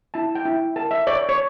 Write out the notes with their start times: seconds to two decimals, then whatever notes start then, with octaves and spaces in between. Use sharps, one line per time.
0.14 E4 A5
0.35 G5
0.45 E4
0.76 A#4 A5
0.91 E5
1.07 C#5 D5
1.29 C#5